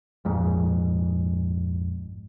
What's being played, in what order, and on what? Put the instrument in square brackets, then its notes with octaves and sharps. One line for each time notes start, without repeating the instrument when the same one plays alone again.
[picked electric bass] A#1 F2 G#2